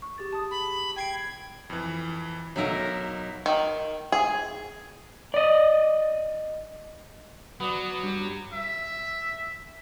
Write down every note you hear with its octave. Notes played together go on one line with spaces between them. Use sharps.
C#6
G4 G#4 A6
A5 D#6
B5
G5 G#6 C7 D7
F2 E3
B1 F#3 D#4 A#4 E5 F5
D#3
G#4
D5 D#5
F#3 B3 F#4 D5
G2 G4
E5